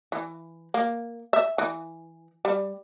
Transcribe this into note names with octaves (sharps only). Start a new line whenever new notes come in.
E3
A#3
E5
E3
G3